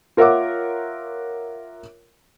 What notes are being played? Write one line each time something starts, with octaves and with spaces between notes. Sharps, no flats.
F4 A#4 C#5 E5 F#5 D6